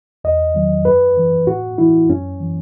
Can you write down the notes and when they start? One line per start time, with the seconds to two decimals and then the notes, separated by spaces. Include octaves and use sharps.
0.24 E2 D#5
0.54 D#3 F#3
0.85 F#2 B4
1.17 E3
1.47 A2 F#4
1.78 E3 E4
2.09 F#2 C#4
2.40 E3